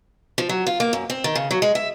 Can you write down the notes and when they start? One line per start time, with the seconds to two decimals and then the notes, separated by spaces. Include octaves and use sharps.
0.38 F3
0.49 F#3
0.67 F4
0.80 A#3
0.93 F#2
1.10 C4
1.24 D#3
1.35 C#3
1.51 F#3
1.62 G#3
1.75 E5